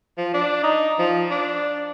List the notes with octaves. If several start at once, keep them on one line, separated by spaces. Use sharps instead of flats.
F3
D4
D#4
F3
D4